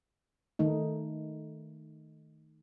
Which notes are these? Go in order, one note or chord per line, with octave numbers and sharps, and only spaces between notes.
D#3 A3 D#4